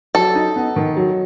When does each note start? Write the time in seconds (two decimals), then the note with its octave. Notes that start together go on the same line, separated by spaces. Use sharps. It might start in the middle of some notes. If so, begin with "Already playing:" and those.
0.15 F#3 A4
0.35 D#4
0.56 B3
0.76 D#3
0.97 F#3